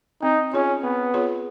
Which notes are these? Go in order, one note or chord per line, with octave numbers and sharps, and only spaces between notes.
C4 D#4
C#4 F4 G#4 C#5
B3 C4
F4 G#4 C#5